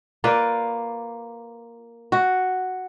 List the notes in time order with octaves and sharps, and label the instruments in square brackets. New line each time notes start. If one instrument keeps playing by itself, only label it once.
[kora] A#3 F4 B4 D5
F#4